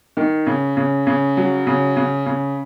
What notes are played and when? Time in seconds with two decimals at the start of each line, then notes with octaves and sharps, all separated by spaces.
0.17 D#3
0.47 C#3
0.77 C#3
1.07 C#3
1.37 F#3
1.67 C#3
1.97 C#3
2.26 C#3